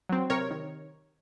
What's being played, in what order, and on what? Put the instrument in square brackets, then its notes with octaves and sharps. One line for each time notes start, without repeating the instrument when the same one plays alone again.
[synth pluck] F#3 C4
C3 A#4 C#5
D#3